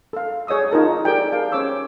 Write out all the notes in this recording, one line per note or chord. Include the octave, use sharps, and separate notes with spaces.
A4 F5
G#4 C#5 D#5 D#6 E6
D#4 F4 A#4 A5
G4 A4 A#4 D5 G5 G#5
G#4 A#4 F5 A5
C#4 C5 C#5 D6 E6